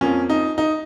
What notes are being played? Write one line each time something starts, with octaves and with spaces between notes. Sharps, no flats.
F2 F3 A#3 C#4
D#4
D#4